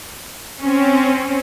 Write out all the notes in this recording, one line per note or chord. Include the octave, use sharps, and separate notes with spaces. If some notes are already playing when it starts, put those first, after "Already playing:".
C4 C#4